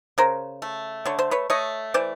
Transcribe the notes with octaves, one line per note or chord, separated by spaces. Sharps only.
C#3 A#4 C5
A3
D3 C#5
C5
B4 C#5
A3 C#5 D#5
E3 C5 D5